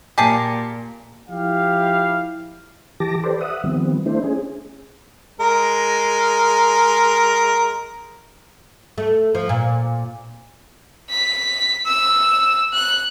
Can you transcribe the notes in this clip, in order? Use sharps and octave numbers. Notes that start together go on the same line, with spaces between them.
A#2 G4 G#4 A5
F3 E4 G4 F5
E3 G4 A5 D6 A#6
G4 A4 B4 C5 D5
E5 F#5 D#6
D#3 F3 G3 B3 C4
A3 D4 E4 C5
C#4 G#4
G#3 A#4
A3
F3
A#2
B6
E6
F#6